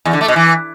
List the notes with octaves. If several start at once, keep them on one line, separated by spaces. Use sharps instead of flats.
E2
D3
A3
B2
E3